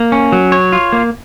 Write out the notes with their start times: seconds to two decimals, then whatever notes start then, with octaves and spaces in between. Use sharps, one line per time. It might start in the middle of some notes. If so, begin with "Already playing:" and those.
Already playing: A#3
0.12 C#4
0.32 F#3
0.52 C#5
0.72 F4
0.93 A#3